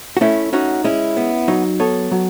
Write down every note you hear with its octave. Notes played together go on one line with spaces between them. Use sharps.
F#4
A3 C#4 E4
C#4 D#4 F#4
G#3 C#4 E4
B3
F#3 D#4
B3 A4 C#5
F#3